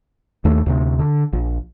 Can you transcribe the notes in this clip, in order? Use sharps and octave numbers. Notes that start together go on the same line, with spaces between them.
D#2 A3
D2 C3
D3
A#1